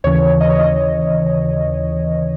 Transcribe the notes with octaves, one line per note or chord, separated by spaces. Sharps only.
D#2 C#3 E3 C#5
D#5
C#5
D#5